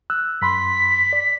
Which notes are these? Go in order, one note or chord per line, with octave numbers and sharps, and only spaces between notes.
E6 F#6
F#2 B5 C6 B6
D5